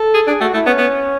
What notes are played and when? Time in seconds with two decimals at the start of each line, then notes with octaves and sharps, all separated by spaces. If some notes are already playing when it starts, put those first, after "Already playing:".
Already playing: A4
0.14 G#4
0.27 D4 G#4
0.40 A3 F#4
0.54 A3 E4
0.66 B3 C#4
0.78 B3